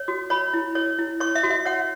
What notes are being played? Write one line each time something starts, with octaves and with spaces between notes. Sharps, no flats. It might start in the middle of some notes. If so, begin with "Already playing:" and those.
Already playing: C#5
F#4
C#5 B5
E4
C#5
E4
C#5 C#6
E5
F#4
E5
C#5 F#5